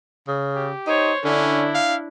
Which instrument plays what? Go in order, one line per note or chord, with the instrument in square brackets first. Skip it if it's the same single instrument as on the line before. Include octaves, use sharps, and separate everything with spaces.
[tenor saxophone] C#3
[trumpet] G4
[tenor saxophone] D#4 [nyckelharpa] C5 C#5
[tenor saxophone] D3 [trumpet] C#4 [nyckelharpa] D4 E4
[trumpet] F5